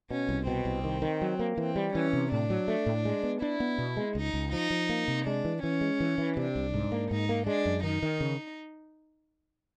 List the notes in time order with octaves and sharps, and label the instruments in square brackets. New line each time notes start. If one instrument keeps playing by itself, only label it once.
[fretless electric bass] B2 [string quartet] C#4
[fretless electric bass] C2
[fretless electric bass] B2 [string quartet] C4
[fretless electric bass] C2
D#3
D#3
F#3
A#3
[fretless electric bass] E3 [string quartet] C4
[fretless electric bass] G3
[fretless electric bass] E3 [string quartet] C#4
[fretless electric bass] C3
[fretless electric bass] A2 [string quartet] D4
[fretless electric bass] F#3
A3
A2
G#3
B3
[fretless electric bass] D4 [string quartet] E4
[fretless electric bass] B3
B2
G#3
[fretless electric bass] C#2 [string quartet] D#4
[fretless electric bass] C#2
[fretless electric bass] F3 [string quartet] D#4
[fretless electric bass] F3
A#3
C3
[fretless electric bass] G#3 [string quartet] D4
[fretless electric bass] E3
[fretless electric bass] E3 [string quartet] C#4
[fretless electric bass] G#3
E3
E3
[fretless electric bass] C3 [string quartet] D4
[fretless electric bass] C2
G#2
A#3
[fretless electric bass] G#2 [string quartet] D#4
[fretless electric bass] A#3
[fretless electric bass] G#3 [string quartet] D4
[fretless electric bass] F#2
[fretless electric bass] D#3 [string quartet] D#4
[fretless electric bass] D#3
C#3